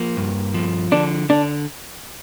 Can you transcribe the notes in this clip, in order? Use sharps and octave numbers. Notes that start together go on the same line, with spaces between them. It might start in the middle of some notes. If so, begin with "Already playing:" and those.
Already playing: F3 A#3
G2
F3
D3 D4
D3 D4